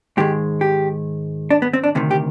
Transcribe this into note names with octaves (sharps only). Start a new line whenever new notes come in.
G#2 D#3 G#3 G4
G4
D4
B3
C4
D4
D2 C3 D#3
G4